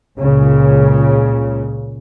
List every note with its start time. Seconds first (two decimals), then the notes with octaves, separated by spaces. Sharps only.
0.18 C#2 A#2 C#3